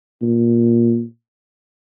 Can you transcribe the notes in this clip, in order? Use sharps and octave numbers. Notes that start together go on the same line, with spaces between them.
A#2